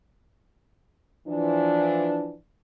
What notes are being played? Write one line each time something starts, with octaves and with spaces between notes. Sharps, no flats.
E3 F3 D4